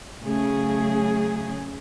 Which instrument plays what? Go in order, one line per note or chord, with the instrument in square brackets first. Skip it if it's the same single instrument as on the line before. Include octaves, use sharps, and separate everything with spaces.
[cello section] C#3 F#3 A3 G#4